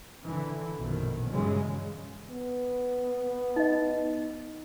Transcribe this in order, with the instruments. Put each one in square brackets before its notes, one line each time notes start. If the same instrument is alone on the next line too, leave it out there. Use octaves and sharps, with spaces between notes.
[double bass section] D3 E3
A#1 F#2 B2 D#3
G2 C#3 E3 F#3 G#3
[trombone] B3
[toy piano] D#4 D#5